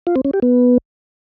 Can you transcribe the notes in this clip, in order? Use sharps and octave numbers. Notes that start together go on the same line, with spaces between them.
F4
C4
C#4
G4
B3